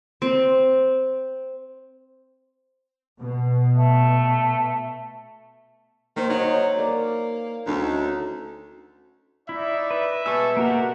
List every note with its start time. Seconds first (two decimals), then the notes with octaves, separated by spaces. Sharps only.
0.22 C4
3.19 B2
3.76 A3
6.17 D#3 A#3 C5
6.30 F#3 D#4 C#5 D#5
6.78 A#3 A#4 D5
7.67 D2 C#4 D#4 F#4
9.49 D#4 E4 D5 E5
9.91 B4
10.26 B2 G3 G#3 G#5 A5 C#6 D6 E6
10.57 A#3 F#4 G4 A#4 F#5